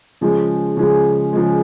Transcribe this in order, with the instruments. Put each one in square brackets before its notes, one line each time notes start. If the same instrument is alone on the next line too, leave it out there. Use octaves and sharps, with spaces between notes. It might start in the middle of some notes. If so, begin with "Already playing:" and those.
[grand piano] C#3 F3 G#3
C#3 F3 G#3
C#3 F3 G#3